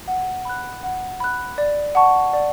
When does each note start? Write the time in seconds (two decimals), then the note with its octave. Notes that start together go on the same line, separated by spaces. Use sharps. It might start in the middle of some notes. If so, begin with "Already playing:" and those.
0.08 F#5
0.45 B5 F#6
0.83 F#5
1.20 B5 F#6
1.58 D5
1.95 F#5 A5 C#6
2.33 D5